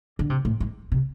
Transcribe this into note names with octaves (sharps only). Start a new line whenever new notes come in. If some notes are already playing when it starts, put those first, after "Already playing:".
D3
C3
A2
G#2
C3